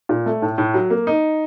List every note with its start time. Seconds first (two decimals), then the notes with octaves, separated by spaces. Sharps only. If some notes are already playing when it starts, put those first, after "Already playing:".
0.09 A#2
0.26 A3
0.42 A2
0.58 A2
0.74 F#3
0.90 A#3
1.07 D#4